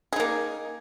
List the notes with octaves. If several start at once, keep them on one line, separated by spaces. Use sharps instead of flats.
A#3 D#4 G#4